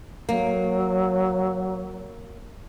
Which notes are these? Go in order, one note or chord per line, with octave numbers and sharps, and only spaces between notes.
F#3 A#3